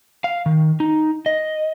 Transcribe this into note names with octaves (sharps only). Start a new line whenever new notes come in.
F5
D#3
D#4
D#5